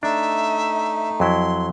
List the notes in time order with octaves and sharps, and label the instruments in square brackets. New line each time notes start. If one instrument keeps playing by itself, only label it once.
[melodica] A3 D#4 [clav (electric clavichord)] D4 [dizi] E5
[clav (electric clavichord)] F2 F#3 E4 [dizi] C6